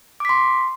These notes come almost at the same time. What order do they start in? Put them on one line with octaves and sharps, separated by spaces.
D6 B6 C6